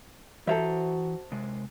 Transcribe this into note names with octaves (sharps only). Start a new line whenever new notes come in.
E3 F#4 A4 C5 E5 A#5
C3 G#3